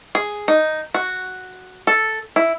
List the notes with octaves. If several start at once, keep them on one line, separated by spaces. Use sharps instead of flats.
G#4
D#4
F#4
A4
E4